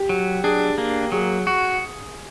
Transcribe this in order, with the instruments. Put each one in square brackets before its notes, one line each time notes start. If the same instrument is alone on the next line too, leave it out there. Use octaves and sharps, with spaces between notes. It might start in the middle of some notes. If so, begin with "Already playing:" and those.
Already playing: [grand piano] G4
[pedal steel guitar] F#3
[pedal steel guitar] D4 [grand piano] G#4
[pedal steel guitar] A#3
[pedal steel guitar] F#3 [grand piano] G#4
[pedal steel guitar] F#4